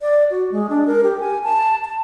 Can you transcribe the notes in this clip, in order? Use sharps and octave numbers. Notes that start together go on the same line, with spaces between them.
D5
F#4
G#3
D4
A#4
G4
G#5
A5
A5